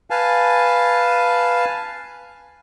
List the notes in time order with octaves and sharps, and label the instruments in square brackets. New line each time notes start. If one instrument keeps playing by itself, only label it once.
[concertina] B4 F5 G#5 A5